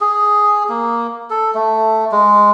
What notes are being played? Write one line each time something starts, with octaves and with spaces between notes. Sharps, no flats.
G#4
A#3
A4
A3
G#3